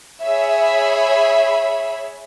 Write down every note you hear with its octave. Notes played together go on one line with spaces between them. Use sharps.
G#4 C#5 E5 B5